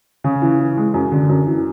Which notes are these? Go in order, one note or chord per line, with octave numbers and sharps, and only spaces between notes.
C#3
E3
E3
G#3
F#2
D3
F#2
E3